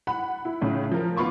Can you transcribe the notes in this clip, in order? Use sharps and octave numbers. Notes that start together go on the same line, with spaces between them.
F#5 B5
E4
A2 C#3
F3 A#4
A1 B3 F4 B5 C#6 D6